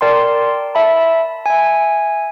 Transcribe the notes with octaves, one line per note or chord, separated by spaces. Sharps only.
A#4 D5 G5 A5 C6
E5 A5 B5
E5 G#5